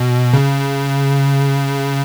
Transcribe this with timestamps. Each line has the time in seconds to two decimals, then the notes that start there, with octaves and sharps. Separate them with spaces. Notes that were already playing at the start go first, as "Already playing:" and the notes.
Already playing: B2
0.33 C#3